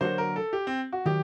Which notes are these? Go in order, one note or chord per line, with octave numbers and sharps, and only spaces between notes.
D3 F#3 A#3 F#4 C5
A#4
A4
G4
C4
F#4
D#3 F#3 G4